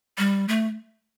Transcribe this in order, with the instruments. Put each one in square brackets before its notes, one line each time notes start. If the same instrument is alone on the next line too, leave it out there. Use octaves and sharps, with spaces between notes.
[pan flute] G3
A3